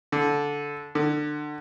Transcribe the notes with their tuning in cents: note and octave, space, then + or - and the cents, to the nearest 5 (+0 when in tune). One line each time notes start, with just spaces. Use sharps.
D3 -15
D3 +25